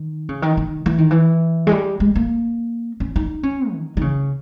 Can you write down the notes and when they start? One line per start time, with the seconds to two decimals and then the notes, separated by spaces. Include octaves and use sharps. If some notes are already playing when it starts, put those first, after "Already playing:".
Already playing: D#3
0.29 C#3
0.42 D#3
0.57 D#3
0.86 E3
0.98 D#3
1.11 E3
1.67 G#3
1.72 G3
2.00 G#3
2.15 A#3
3.00 C#4
3.16 D#4
3.43 C#4
3.73 D#3
3.97 D#3
4.01 C#3